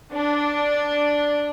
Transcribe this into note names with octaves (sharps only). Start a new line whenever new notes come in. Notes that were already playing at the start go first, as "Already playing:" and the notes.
D4